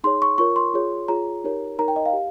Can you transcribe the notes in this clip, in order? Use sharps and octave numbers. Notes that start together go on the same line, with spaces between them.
D#4 G#4 C#5 C6
C#6
F4 A#4 C#5 C#6
C6
F4 G#4 C#5
F4 G#4 C#5 A#5
D#4 G4 A#4 C#5
D#4 A#4 C#5 A#5
G5
D#5
F5
G4